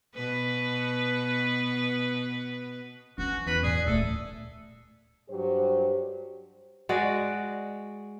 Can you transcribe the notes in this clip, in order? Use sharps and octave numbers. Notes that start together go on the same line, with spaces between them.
B2 B3 B4
E3 F3 C#4 F#4
E2 B4
A2 G#4 D5
D1 A#2 A3 A4
G2 F#3 G4 C5
G#3 F#4 D5